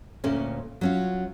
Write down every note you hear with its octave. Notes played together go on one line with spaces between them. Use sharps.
D2 A#2 A3 C#4
F#3 C#4 F4